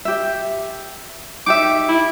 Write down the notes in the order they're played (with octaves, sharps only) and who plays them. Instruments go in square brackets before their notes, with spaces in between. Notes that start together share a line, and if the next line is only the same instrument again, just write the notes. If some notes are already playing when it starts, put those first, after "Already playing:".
[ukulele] G4 E5
[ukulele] D#4 G4 E5 [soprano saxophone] D6
[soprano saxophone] E4